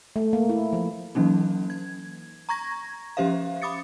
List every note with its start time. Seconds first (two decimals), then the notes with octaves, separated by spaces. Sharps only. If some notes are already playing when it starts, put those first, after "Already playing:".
0.16 A3
0.33 A#3
0.49 E4
0.73 F3
1.15 E3 F#3 A#3 C#4 D#4
1.70 G#6
2.49 A#5 C#6 G#6 A#6
3.17 F3 C#4 G4 C5 E5 F5
3.62 B5 D6 D#6 A6 C#7